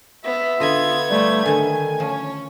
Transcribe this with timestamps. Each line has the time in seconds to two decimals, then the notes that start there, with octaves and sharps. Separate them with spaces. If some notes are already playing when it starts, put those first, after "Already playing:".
0.24 B3 E5
0.60 D3 B3 F4 D#5 G#6
1.11 G3 A3
1.46 D3 D#3 A3 G#5
2.00 F3 C#4